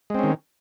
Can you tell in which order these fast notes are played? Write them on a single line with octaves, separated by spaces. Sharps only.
G#3 C4 C#4 D#3